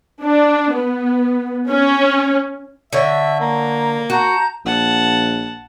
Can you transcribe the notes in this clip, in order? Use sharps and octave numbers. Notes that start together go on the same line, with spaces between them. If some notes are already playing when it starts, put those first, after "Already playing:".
D4
B3
C#4
D3 C#5 E5
A#3 A#5
F#4 A5 A#5 G6
A#1 F#5 A5